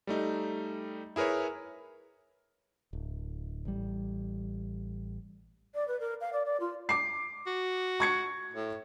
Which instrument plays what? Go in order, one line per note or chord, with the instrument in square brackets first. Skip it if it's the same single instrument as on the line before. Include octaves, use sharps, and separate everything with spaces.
[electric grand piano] G3 A3 D#4
E4 G#4 A#4 B4 C#5
[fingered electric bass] D1
A1 G3
[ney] D5
B4
A#4
F5
D5
D5
F4
[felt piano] D6 C7
[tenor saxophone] F#4
[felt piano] C#6 G#6 C#7
[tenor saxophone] A2